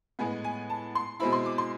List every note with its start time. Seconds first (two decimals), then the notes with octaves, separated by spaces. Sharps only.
0.19 A2 G#3 B3 G#5
0.44 G#5
0.70 A5
0.95 C6
1.20 B2 G#3 C4 E4 B5
1.33 C6
1.46 D6
1.58 C6